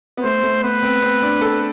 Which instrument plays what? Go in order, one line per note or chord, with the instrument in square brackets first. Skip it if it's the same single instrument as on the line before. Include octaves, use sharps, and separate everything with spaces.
[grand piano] B3
[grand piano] A3 [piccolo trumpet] C5
[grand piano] A3
[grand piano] B3 [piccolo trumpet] B4
[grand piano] C4
C4
D4
A4